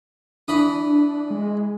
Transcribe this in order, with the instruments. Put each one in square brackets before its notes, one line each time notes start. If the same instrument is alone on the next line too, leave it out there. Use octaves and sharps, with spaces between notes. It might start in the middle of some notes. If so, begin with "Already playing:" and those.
[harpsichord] E3 B5 D#6 [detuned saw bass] D4
[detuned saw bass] G#3